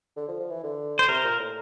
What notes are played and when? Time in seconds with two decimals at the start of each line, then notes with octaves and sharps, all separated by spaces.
0.16 D3
0.28 F3
0.40 F3
0.51 E3
0.63 D3
0.99 C5
1.08 C3 A#4
1.24 A#2
1.39 A2